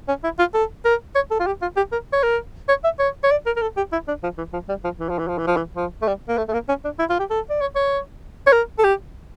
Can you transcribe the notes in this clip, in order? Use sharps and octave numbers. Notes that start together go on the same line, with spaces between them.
C#4
E4
F4
A4
A#4
C#5
A4
F4
G4
F4
G4
A#4
C#5
A#4
C#5
E5
C#5
C#5
D5
A#4
A#4
A4
G4
E4
D4
F3
E3
F3
G3
F3
E3
F3
E3
F3
E3
F3
E3
F3
A3
G3
A#3
A3
A3
A#3
C#4
D4
E4
F4
G4
A4
D5
C#5
C#5
C#5
A#4
A4
G4